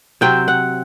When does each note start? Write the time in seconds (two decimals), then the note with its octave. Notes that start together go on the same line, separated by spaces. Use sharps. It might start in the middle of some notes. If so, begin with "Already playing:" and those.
0.21 C3 F#3 C4 G5
0.48 F#5